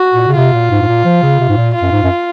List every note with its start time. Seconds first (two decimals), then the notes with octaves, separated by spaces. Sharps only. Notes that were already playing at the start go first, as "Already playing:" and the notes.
Already playing: F#4
0.13 A#2
0.28 C#3
0.36 C3 F4
0.53 A#2
0.71 G#2
0.82 G#2
0.88 A#2
1.05 F3
1.23 C#3
1.40 C3
1.49 G#2
1.57 A#2
1.75 F4
1.82 F#2
1.91 G#2
2.03 F#2